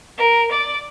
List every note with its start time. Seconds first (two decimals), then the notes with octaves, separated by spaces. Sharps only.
0.18 A#4
0.51 D5